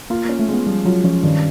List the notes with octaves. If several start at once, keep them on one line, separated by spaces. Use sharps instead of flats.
A#3 F4
A#3 C#4
A3
G#3 B3
F3 G3
F#3 F4
F3 C#4
G2 D#3